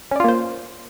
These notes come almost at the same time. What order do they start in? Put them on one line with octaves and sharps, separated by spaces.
C#4 D5 F4 A#3 C5